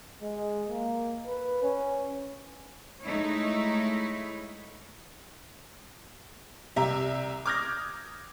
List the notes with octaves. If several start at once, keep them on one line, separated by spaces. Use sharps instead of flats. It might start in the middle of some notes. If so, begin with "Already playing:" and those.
G#3
A#3
B4
C#4
G#3 A3 D#4 E4 C#5
C2 G4 E5 A#5
D6 D#6 F6 G6 G#6 A#6